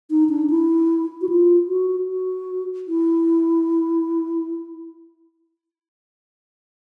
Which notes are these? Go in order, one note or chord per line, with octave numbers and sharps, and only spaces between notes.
D#4
D4
E4
F#4
F4
F#4
F#4
E4